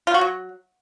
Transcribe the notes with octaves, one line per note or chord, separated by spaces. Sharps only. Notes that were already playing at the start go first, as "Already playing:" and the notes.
F4
F#4
F#3